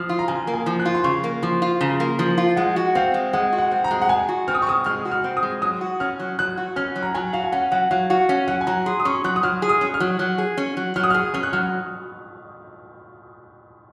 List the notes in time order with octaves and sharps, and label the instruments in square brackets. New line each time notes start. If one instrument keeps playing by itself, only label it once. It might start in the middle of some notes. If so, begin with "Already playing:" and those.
Already playing: [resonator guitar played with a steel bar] F3 [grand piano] D#6 F6
[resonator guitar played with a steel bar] F4
[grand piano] A#5
[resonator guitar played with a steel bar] C#3 [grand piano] G#5
[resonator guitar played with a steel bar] A#3
[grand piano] G#5
[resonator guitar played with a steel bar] F3
[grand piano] F#6
[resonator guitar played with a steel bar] F4
[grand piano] C6
[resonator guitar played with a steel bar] C#3 [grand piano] C#6
[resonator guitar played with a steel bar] A#3
[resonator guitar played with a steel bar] F3 [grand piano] C6
[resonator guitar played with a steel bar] F4
[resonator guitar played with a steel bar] C#3 [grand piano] A#5
[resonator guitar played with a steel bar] A#3
F3
F4
[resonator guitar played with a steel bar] G#3 [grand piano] F#5
[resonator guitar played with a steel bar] F#4
[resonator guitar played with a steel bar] C4 [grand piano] F5
[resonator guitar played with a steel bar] G#3
[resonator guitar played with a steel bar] G#3 [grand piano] F#5
[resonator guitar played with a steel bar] F#4
[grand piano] F#5
[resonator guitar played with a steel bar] C4
[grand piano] A#5
[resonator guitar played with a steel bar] G#3
[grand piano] F#5
[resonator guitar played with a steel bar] G#3 [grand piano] G#5
[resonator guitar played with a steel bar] F#4
[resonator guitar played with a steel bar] C4 [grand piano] F6
[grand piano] D#6
C#6
[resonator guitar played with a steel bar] G#3 [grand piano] D#6
[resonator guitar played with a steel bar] G#3 [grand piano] F6
[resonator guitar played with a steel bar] F#4
[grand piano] F6
[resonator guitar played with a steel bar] C4
[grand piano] D#6
[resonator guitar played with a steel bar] G#3
[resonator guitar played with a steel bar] F#3 [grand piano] D#6
[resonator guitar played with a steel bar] F#4
[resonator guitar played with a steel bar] C#4 [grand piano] F6
[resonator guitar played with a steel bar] F#3
[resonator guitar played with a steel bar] F#3 [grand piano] F#6
[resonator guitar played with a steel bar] F#4
[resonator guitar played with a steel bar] C#4 [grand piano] F6
[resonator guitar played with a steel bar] F#3
[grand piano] A#5
[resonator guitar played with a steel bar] F#3 [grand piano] G#5
[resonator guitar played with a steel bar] F#4 [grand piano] F5
[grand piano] G#5
[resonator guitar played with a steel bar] C#4 [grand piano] F#5
[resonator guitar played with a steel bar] F#3 [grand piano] F#5
[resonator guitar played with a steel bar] F#3 [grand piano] F5
[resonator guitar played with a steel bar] F#4 [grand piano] F5
[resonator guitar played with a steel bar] C#4
[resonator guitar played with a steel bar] F#3 [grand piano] F#5
[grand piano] G#5
[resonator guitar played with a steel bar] F#3 [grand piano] A#5
[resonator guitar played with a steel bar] G#4 [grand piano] C6
[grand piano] D#6
[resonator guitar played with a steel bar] C#4 [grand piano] C#6
[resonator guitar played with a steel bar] F#3 [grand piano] F#6
[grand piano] D#6
[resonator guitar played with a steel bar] F#3 [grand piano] F6
[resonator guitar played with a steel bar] G#4
[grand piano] D#6
[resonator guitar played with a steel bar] C#4
[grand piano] F6
[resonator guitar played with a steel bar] F#3
F#3
G#4
C#4
F#3
[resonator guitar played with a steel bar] F#3 [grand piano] F6
[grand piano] D#6
[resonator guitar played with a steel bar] G#4 [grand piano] F6
[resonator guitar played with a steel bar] C#4 [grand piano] F6
[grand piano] F#6
[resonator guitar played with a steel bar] F#3 [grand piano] F6